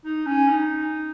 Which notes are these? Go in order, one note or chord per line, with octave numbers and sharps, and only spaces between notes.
D#4
C#4
D#4